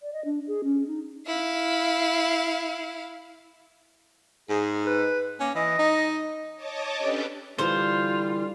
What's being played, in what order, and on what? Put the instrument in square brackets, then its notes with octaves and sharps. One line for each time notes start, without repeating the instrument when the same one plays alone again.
[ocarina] D5
D#5
D4
G#4
C#4
D#4
[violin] E4 F5
[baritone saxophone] G#2 [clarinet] G#4
[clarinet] B4
[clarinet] A#3 [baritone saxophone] C#4
[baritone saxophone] E3 [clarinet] D#5
[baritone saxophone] D#4
[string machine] C#5 D#5 A5 D6
C#4 D4 G4 A4 B4 G5
[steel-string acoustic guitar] D3 E3 [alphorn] G3 [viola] F4 [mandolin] C5